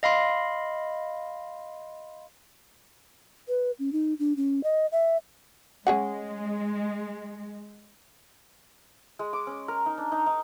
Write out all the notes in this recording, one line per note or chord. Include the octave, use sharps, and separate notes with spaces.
D#5 F5 B5 C6
B4
C#4
D#4
D4
C#4
D#5
E5
G#3 C#4 G#4 F#5
G#3
D6
C#4
A#4
D#4
D4
D#4
D#4